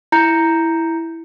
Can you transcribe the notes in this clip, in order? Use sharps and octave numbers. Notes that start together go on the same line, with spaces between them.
E4 A#5 G6 C#7